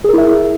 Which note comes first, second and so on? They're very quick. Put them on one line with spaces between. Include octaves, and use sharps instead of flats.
G#4 A#4 E4 E5